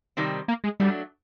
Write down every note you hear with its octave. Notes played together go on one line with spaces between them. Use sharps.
C3 D#3 G3 C4
A#3
G#3
F#3 G3 A3 D4